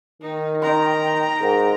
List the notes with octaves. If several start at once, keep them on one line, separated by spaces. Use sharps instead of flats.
D#3 D#4
D#4 G5 A#5 C6
G#2 A#4